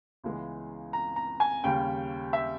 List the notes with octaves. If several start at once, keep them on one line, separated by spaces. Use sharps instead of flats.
C#2 C#3 E3 G#3 B3
A#5
A#5
G#5
D#2 C#3 G3 G5
E5